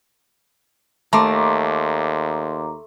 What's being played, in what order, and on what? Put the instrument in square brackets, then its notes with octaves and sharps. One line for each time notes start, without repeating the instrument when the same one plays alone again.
[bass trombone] D#2 [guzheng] A3 [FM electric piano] A#5 C6 D6